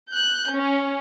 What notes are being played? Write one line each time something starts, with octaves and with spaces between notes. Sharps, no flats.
F#6 G6
C#4